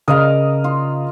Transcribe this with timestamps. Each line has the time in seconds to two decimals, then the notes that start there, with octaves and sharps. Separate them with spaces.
0.08 C#3 A#4 D#5 F5 D#6
0.64 F4